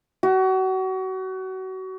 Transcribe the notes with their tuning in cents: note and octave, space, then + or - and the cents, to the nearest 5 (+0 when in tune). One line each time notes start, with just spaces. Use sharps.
F#4 +30